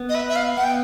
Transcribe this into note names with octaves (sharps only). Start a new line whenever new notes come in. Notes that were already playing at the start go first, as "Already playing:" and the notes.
Already playing: B3
D#5
B4 E5
E5
F5
B3 F#5
G5